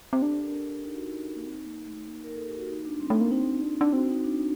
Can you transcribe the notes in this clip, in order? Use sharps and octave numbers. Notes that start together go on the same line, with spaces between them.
C4 G4
D4 A4
A#4
D#4
F#4
D#4
A#3
C4
A#3
A3
A#3
A#4
A4
G4
F#4
D#4
D4
G3 C4
A3
A#3
C4 D#4
D4
D4
C4 F#4
D#4
D4